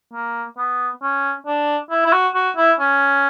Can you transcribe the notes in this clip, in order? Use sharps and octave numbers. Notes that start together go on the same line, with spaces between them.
A#3
B3
C#4
D4
E4
E4
F#4
F#4
E4
C#4